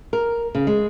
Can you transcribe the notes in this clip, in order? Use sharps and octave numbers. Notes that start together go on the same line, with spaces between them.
A#4
C#3
G#3